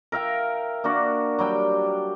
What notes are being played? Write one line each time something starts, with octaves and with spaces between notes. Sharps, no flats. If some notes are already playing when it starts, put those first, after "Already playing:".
A#4 E5 F5 G5
A#3 D4 F#4
F#3 G3 G5